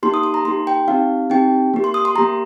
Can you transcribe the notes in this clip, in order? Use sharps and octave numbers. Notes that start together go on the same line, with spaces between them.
A#3 D#4 G4 C6
D#6
C6
A#5
A#3 D#4 G4 C6
G5
C4 D#4 G4 F5
C4 D#4 G4 G5
A#3 G4
C6
D#6
C6
A#3 G4 A#5